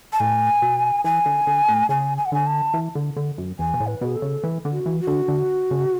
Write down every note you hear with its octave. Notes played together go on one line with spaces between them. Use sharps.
A5
A2 G#5
B2
E3 G#5
D3
D3
A2
C#3 G#5
G#5
F#5
D3 G#5
A5
E3
D3
D3
F#2
E2 G#5
B2
A2
B4
B2 G#4
A4
C#3
E3
D3
F#4
E3
F#4
D3
D3
C#3